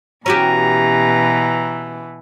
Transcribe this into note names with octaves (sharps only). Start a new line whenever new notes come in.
B2 E3 C#4 F#4 G4 A#5